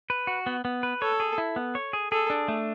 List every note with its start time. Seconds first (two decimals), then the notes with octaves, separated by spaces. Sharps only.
0.10 B4
0.27 F#4
0.46 B3
0.65 B3
0.83 B4
1.01 A4 C#5
1.20 G#4
1.38 E4
1.56 B3
1.75 C#5
1.93 G#4
2.12 G#4 A4
2.30 D4
2.48 A3